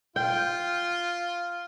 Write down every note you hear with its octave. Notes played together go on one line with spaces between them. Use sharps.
F4 G5